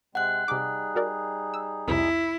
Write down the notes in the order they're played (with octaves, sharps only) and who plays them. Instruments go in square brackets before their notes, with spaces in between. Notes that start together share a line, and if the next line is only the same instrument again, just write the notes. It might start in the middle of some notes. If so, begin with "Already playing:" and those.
[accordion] C3 G#3 C4 [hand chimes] F#5 F#6
[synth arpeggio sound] C3 D6 [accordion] G3 D#4 G#4
[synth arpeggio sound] F#4 A#4 D5
E6
[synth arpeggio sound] C2 F2 C3 [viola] E4